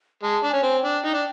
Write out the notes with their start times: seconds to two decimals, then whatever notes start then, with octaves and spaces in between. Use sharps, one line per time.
0.23 G#3 A5
0.44 D4
0.50 C#4 G#5
0.63 C4
0.77 G5
0.84 D4
1.05 D#4
1.14 D4